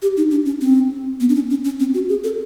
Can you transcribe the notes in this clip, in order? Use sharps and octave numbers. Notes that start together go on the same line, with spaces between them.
G4
D#4
D4
C#4
C4
B3
D4
C#4
C#4
C#4
C4
F#4
G#4
A4